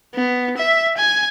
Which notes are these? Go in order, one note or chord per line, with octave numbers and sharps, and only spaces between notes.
B3
E5
G#5